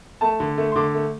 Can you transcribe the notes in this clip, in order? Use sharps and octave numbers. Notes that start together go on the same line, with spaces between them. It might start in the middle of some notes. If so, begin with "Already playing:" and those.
A3 A5
D3
A3
C6
D3 D6
A3